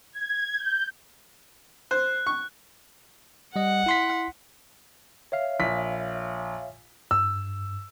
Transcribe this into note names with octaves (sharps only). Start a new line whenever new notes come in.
G#6
G6
C5 F#6
C#6
G3 D#5 F#5
E4 C6 B6
C#5 E5 F5
A#1 B6
G2 E6